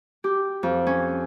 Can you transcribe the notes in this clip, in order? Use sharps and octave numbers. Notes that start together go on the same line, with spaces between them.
G4
F2
C#4